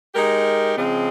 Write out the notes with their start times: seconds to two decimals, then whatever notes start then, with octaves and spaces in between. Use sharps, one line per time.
0.14 G#3 D#4 G4 A#4
0.75 C#3 F3 G#3 C4